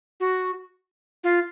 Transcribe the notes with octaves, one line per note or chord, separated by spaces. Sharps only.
F#4
F4